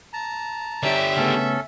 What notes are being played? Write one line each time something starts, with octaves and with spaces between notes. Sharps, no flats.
A5 A#5
D3 G4 C#5 D5 E5
C#3 A3 B3 C#4 A4